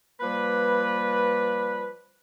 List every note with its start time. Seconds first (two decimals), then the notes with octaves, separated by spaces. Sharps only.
0.20 F3 G3 A#3 B4